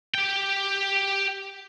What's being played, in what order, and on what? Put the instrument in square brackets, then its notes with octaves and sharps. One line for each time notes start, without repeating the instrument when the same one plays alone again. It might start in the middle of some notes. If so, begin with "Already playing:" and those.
[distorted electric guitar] G4 G5